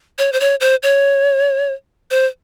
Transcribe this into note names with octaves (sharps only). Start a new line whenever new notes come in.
C#5
C5
C#5
C5
C#5
C5